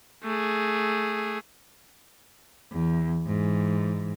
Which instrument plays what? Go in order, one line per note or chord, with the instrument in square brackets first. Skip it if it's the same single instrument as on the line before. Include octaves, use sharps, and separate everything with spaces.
[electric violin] A3 G#4
[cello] E2
G#2 E3